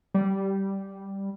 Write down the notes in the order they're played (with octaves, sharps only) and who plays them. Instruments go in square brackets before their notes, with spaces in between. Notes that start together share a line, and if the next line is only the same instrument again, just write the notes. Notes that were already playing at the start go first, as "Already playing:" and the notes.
[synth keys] G3